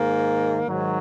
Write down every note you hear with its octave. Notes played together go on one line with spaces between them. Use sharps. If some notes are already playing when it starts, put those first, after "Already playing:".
Already playing: G#2 D#3 A#3
G#2 D#3 F#3